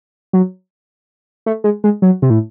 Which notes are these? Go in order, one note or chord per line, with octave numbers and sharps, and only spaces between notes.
F#3
A3
G#3
G#3
F#3
C3
A2